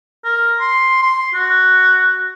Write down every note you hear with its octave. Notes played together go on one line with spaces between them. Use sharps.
A#4
C6
C6
F#4